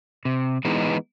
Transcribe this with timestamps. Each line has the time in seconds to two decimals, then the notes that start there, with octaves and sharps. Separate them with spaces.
0.25 C3
0.65 E3 G#3 B3 D#4